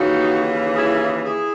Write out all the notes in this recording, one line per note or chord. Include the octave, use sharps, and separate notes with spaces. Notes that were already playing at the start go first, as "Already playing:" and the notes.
Already playing: D#2 C#3 E3 D#4 F#4
E4 G#4
E4 G#4